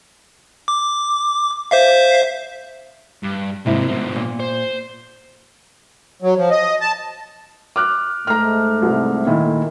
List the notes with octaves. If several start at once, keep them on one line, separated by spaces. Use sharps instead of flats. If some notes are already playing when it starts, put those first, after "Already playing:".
D6
C5 E5 F5
G2
G#2 C3 A#3 E4
G#2 B2 F3
A#2
C5
F#3
F3
D#5
A5
D6 F6 F#6
G#2 A3 A#5 F6
C2 C3
A#2 D#3 E4